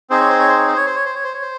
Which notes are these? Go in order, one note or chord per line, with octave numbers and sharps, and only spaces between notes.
C4 D#4 G#4 C5
C#5
C5
C#5
C5
C#5
C5
C#5
C5
C#5
C5
C#5
C5
C#5
C5